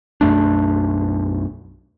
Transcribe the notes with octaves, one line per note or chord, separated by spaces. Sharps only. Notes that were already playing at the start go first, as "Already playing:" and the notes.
B1 F#2 A3 D4